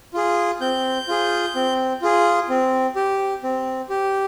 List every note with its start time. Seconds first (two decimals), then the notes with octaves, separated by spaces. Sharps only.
0.14 F4 G#4
0.61 C4 G6
1.08 F4 G#4
1.55 C4
2.02 F4 G#4
2.49 C4
2.96 G4
3.43 C4
3.89 G4